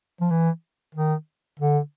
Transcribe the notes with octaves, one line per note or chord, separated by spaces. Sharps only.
F3
E3
D#3
D3